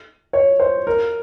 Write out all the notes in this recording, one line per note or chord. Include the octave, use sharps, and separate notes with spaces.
C#5
C5
A#4